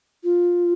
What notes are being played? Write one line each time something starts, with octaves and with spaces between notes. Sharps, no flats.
F4